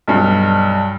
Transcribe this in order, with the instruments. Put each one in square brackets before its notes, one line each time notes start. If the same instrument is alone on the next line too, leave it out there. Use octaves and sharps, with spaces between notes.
[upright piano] B1 G2